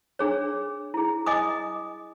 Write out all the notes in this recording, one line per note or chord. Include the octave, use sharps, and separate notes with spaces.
D4 G#4 C#5
E4 G#4
D#5 G#5 D6 D#6